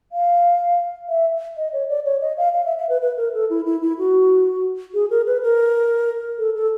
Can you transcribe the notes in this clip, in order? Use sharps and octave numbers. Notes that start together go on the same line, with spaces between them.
F5
E5
D#5
C#5
D5
C#5
D#5
F5
F5
E5
E5
B4
B4
A#4
A4
E4
E4
E4
F#4
G#4
A#4
B4
A#4
A4
A4